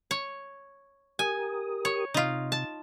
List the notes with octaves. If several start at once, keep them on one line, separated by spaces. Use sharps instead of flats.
C#5
G4 A#4 G#5 D#6
C#5
C3 D#4 F4
A5